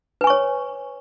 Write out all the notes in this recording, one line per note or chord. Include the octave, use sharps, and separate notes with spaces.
B4 C#5 G#5 C#6